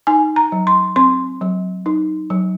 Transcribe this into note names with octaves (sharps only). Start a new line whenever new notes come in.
D#4 G#5
A#5
F#3
C6
C4 C6
F#3
D#4
F#3